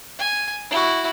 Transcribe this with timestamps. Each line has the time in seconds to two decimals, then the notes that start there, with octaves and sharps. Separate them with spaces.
0.19 G#5
0.70 E4 F#4